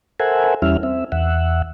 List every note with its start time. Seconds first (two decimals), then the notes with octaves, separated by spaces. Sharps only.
0.20 A4 A#4 C5 E5 F#5 G#5
0.62 E2 G3 C#4 E4 E5 F6
0.83 C4 E5
1.12 E2 E5 F#5